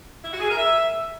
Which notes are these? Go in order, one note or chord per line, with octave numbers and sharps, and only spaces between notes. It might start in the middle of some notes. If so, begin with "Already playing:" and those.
E4
F#4
G#4
A#4
E5